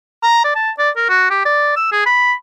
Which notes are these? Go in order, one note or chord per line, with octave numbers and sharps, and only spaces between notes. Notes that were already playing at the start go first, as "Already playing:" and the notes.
A#5
D5
A5
D5
A#4
F#4
G4
D5
E6
G#4
B5